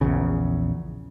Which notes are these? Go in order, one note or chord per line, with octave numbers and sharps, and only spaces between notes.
A#1 E2 C#3